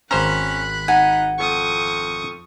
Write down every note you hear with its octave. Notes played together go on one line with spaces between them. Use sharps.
G#1 C#4 C5 A#5 B5 F#6
D#4 F#5 G#5
F2 C#6 D#6